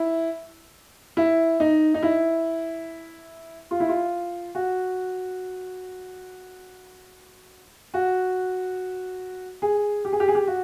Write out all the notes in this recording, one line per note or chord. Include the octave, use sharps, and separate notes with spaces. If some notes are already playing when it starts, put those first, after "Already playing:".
Already playing: E4
E4
D#4
D#4
E4
F4
E4
F4
F#4
F#4
G#4
G4
G#4
G4
G#4
G4
F#4